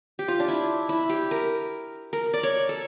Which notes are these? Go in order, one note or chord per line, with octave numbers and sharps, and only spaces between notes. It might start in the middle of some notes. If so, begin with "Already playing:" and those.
G4
F4
D4
E4
E4
G4
A#4
A#4
D5
C#5
A4